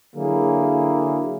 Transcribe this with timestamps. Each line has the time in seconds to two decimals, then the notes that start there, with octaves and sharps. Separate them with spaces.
0.16 D3 F#3 A#3 E4 G#4